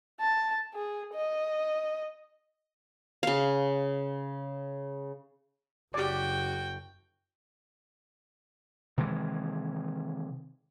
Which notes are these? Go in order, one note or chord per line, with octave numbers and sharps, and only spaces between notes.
A5
G#4
D#5
C#3 F5
F#1 F#4 G4 D5 G5
C3 D#3 E3 G#3